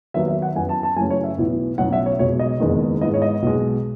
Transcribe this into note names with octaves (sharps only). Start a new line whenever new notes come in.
D#2 D#3 F#3 B3 E5
E5
F#5
F#2 E3 B3 G#5
A5
A5
F#2 C#3 E3 A3 C#4 G#5
C#5
E5
B1 A2 E3 B3
B1 A2 F#3 C#4 F#5
E5
C#5
B1 B2 G#3 C#5
D#5
F#1 E2 D#3 G#3 B3
G#2 E3 G#3 B3 D#5
C#5
D#5
B1 B2 G#3